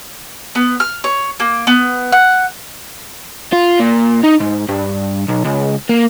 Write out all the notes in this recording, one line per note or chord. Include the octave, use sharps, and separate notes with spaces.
B3
F6
C#5
A#3
B3
F#5
F4
A#2
D#4
G#2
G2
B1
C#2
A#3